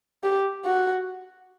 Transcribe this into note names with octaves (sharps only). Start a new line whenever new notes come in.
G4
F#4